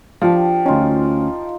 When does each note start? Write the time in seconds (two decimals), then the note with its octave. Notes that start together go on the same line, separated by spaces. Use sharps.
0.21 F3 D4 G4 F5
0.66 D2 C#4 D#4 F4